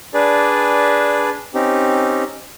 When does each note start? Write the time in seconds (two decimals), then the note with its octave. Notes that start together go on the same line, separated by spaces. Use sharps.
0.14 D4 G#4 B4 D5
1.54 C4 C#4 D#4 G4